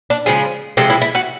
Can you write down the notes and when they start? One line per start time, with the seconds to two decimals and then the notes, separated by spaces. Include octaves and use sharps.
0.10 D4
0.26 C#3 F3 G#3 G#4
0.77 C3 F3 G#3 A4
0.90 E4
1.01 E4
1.15 F#4